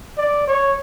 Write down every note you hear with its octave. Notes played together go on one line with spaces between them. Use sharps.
D5
C#5